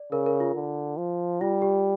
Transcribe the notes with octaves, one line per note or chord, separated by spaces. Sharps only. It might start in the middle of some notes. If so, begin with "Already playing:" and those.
Already playing: D5
C#3 A#4
A#4
F4
D3
F3
G3 F4
G4